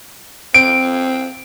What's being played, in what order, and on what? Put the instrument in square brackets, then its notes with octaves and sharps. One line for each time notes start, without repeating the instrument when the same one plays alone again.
[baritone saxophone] C4 [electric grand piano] D7